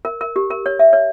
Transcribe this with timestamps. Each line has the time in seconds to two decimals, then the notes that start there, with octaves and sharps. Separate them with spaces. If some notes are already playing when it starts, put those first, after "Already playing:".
0.05 A#4
0.21 A#4
0.36 G4
0.50 A#4
0.66 C#5
0.79 E5
0.93 C#5